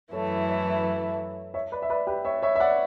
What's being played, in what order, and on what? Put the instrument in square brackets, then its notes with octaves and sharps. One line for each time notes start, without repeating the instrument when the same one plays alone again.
[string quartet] F#2 E3 A3 E4 [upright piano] A4 C#5
[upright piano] C#5 E5
C#5 E5
B4 D5
E5
B4 D5
G4 B4
C#5 E5
C#5 E5
E5
D5 F#5